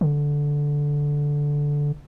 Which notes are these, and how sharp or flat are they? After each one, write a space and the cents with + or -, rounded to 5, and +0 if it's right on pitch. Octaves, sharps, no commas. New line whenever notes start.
D3 -10